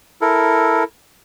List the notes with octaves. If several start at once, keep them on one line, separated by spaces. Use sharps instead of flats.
E4 A4 A#4